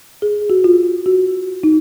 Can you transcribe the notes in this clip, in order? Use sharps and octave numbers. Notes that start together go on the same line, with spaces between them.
G#4
F#4
F4
F#4
D#4